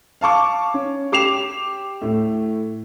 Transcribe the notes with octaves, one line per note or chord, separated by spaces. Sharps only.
F5 A5 C#6 D6
C#4
G4 D6 C7 E7 F7
A2 A3